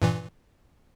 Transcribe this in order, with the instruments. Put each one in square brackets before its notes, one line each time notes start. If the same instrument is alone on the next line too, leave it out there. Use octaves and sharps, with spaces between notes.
[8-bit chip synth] G2 A#2 E3